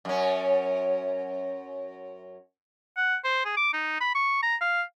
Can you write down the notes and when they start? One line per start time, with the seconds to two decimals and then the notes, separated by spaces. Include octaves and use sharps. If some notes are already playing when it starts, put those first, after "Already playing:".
0.05 F#2 C#4
2.97 F#5
3.24 C5
3.45 G#4
3.57 D6
3.73 D#4
4.01 B5
4.15 C#6
4.43 A#5
4.61 F5